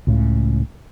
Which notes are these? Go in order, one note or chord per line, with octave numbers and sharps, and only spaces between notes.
C#2 A2 C#3